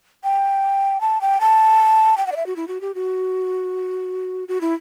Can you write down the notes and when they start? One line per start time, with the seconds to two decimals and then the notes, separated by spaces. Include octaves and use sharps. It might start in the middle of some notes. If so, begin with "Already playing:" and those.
0.24 G5
1.01 A5
1.21 G5
1.41 A5
2.17 G5
2.27 F#5
2.32 D5
2.36 E5
2.46 F#4
2.56 E4
2.68 F#4
2.81 G4
2.95 F#4
4.48 F#4
4.61 E4